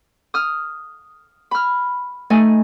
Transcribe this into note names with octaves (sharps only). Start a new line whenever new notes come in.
D#6 F6
B5 F6
A3 D#4 G#5